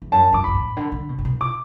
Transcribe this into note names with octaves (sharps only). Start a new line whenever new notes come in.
E2
F#2 A5
F#2 D6
F#2 B5
A2
D3
D3
B2
A2
B2
D6